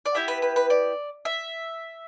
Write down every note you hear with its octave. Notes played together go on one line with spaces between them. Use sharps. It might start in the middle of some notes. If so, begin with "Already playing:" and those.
D5
B3 E4 G4 E5
B4
B4
B4
D5
E5